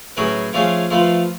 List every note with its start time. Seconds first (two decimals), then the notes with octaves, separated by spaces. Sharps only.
0.17 A2 F#3 C#4 G#4 B4
0.53 F3 A3 C#4 F4 G#4
0.91 F3 A3 F4 B4